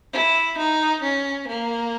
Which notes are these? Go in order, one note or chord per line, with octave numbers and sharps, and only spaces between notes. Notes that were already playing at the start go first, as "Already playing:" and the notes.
E4
D#4
C#4
A#3